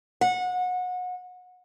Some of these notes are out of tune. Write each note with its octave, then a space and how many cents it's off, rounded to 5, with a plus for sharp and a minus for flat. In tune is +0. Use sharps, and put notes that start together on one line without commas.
F#5 -25